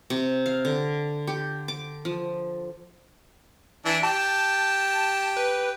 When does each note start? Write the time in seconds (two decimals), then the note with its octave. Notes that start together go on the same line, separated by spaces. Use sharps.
0.10 C3
0.46 F5
0.65 D3
1.27 G4
1.68 D6
2.05 F3
3.85 E3 D4
4.03 G4 A5
5.36 B4